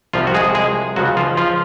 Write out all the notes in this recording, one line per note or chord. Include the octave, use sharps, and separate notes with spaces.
C2 C3 F3 F4
F#4
G#3 G#4
G#3 G#4
C#2 C#3 F3 F#3 F#4
F3 F4
F3 F4